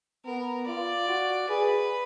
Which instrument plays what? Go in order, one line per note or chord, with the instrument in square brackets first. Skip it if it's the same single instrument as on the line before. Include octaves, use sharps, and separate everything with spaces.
[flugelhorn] B3 [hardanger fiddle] A#4
[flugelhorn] F4 [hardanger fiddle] D5
[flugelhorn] F#4
[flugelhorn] G#4 [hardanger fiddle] B4